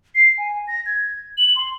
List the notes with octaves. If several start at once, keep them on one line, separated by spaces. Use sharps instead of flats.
C7
G#5
A#6
G#6
F#7
C6